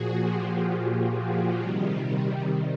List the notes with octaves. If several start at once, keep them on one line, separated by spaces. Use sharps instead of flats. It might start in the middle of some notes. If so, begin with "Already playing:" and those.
Already playing: A#2 F3 F#4 G#4
F4 G4
C3 D#3 G3